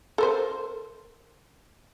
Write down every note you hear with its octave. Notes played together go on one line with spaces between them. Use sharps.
A4 A#4 C5